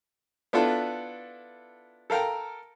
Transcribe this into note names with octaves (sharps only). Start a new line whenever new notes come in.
B3 D4 E4 F4 A4 B4
A4 A#4 F5 G5 A#5